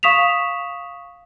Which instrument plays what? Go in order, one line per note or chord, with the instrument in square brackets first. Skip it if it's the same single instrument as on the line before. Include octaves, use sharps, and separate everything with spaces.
[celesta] F5 C#6 D#6 B6 E7 F7